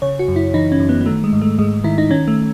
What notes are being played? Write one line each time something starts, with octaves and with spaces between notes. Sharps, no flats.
C#3 C#5
F#4
F#2
E4
E3 D#4
C#4
F#2
B3
B3
D#3 A3
G#3
G#2
A3
G#2 G#3
D#3 E4
D#4
D#3 C#4
A3